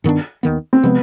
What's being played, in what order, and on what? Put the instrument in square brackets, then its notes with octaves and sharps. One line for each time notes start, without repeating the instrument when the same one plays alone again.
[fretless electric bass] G2 D#3 B3 D4
D#2 D#3 B3
[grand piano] C4
[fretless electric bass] C3 F3 G#3 C4 [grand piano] B3